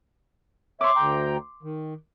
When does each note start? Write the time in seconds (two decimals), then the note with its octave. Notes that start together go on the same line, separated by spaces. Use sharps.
0.81 C#5 E5 C6 D6
0.96 D2 G5 A#5
1.63 D#3